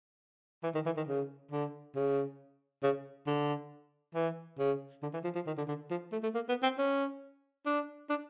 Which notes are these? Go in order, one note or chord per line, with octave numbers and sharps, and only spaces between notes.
E3
D#3
E3
D#3
C#3
D3
C#3
C#3
D3
E3
C#3
D3
E3
F3
F3
D#3
D3
D3
F3
A3
A3
A#3
B3
C4
C#4
D4
D4